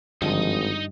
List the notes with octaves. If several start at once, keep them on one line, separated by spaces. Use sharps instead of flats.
G#1 G2 D3 F3 D#4 D#5